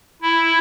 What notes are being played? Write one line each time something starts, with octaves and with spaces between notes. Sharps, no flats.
E4